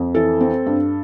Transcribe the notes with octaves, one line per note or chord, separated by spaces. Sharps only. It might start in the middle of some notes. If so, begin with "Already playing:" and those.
Already playing: F2
E3 A4
C4
G2